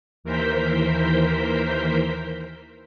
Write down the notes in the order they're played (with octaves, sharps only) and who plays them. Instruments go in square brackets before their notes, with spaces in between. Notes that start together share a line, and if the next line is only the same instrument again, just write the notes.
[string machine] D#2 E3 A#4 C5 G6 B6